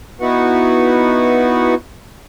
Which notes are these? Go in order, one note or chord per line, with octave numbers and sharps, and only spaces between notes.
B3 D#4 E4 F#4 B4 F#5